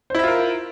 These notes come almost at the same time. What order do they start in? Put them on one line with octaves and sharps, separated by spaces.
C5 E4 E5 F4 A#4